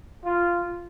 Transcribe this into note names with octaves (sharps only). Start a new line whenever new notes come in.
F4